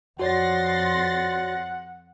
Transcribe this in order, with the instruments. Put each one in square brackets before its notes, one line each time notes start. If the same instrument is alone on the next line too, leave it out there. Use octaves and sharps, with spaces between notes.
[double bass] F2 [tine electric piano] F#4 C#5 D5 [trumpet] F#5 [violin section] C6 A6 A#6